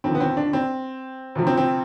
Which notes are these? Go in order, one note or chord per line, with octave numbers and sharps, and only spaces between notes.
D#2 D3 F3 C4
B3
C4
D4
C4
D2 C3 F3
C4
C4